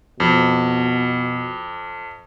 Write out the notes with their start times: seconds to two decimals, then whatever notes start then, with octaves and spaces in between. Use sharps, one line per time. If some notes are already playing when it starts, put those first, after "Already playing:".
0.20 F2 B2